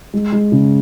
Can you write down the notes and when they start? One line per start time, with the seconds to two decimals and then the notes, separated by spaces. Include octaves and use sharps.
0.14 G#3
0.32 G#3
0.52 C#3